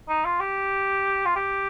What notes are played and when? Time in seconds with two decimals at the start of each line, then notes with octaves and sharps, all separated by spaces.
0.09 D#4
0.25 F4
0.40 G4
1.26 F4
1.36 G4